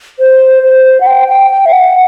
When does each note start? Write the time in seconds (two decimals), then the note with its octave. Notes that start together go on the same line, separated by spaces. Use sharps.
0.19 C5
0.63 C5
1.01 F#5
1.07 G5
1.28 G5
1.50 G5
1.66 E5
1.72 F#5